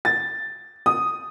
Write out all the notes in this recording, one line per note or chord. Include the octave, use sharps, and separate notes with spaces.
A6
D#6